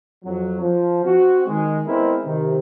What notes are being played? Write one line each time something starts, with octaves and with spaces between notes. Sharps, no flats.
F2 F#3
F3
C4 F#4
D#3 G#3
G#3 B3 C4 E4 A#4
C3 D#3